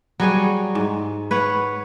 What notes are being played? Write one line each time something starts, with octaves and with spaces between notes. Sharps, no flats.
F#3 G3 G#4 C#5
G#2
B4 C#5 F#5